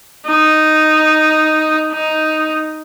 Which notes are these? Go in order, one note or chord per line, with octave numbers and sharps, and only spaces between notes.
D#4
D#4